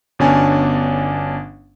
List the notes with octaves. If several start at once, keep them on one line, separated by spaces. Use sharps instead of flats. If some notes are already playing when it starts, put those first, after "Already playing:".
G1 B2 C#4 D4 G#5 A5